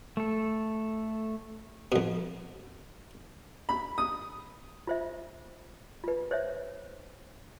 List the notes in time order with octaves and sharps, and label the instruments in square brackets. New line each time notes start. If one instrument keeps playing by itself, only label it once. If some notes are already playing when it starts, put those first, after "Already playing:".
[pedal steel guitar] A3 A4
[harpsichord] F2 B2
[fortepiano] B5
D#6
[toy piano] F4 C5 E5
F4 B4
C5 C#5 E5